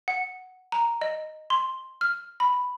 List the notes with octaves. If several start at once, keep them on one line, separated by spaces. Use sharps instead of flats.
F#5
A#5
D#5
C6
F6
B5